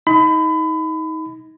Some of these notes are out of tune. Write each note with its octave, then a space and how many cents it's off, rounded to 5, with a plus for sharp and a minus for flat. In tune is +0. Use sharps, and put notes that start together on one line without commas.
D#4 +30 B5 +30